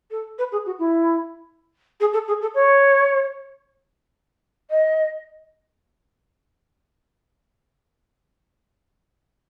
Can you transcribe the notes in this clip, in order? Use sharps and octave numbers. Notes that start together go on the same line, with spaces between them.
A4
B4
G#4
F#4
E4
G#4
A4
G#4
A4
C#5
D#5